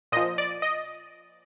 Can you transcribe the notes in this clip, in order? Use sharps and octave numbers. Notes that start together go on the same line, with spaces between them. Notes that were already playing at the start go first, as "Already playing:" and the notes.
A#2 F3 D#5
D5
D#5